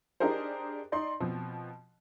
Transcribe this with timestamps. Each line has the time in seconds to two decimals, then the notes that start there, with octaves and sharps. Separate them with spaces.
0.20 D4 D#4 G4 G#4 A#4 C5
0.92 D#4 D5 C6
1.20 B2 F3 C4